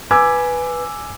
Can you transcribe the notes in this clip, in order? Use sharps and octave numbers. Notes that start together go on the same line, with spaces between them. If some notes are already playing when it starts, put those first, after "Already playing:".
B4 G#5 D6 E6 G#6